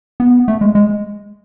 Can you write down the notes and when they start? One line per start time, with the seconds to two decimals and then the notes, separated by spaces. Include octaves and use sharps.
0.20 B3
0.48 A3
0.61 G#3
0.75 G#3